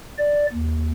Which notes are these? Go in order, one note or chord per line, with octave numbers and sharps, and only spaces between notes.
D5
D#2